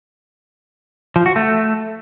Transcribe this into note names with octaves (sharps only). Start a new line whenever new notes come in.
F3
F#4
A3